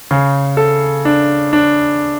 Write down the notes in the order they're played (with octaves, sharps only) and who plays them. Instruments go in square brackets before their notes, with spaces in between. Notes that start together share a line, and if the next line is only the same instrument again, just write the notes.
[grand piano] C#3
A4
D4
D4